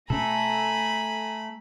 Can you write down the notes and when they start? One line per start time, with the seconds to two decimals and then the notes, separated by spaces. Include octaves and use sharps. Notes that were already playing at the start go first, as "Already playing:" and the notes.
0.10 B2 A3 C#4 A4 G#5 A#5 B5